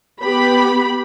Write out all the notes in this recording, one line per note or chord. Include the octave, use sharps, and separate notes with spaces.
B3 G4 B5